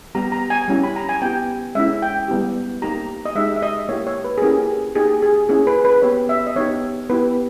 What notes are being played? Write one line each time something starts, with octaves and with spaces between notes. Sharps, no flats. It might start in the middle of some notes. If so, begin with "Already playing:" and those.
G3 B3 G4 A#5
A#5
G#5
G3 C#4 E4 G4
B5
A#5
G#5
B3 E4 G4 G5
G#3 C#4 E4 E5
G5
G3 B3 E4 G4
A#3 D#4 G4 A#5
D#5
G#3 D#4 G4 E5
E5
D#5
A#3 E4 G4 C#5
C#5
B4
G#4
A#3 C#4 E4 G4 A#4
A#3 D#4 G4 G#4
G#4
A#3 C#4 E4 G#4
B4
B4
B3 G4 C#5
E5
D#5
B3 D#4 G4 C#5
B3 E4 G4 B4